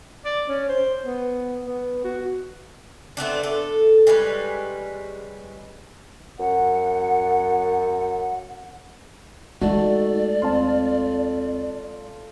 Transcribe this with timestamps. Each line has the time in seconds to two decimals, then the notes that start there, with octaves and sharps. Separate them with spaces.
0.25 D5
0.49 C#4
0.69 C5
1.05 B3
1.66 B3
2.04 F#4
3.17 A3 B3 C4 D4
3.43 A4
4.07 G3 G#3 C#4 B4
6.39 F#2 F#5
9.62 G#3 A3 D#4 F#4 D5
10.42 D#2 C4 F4 A5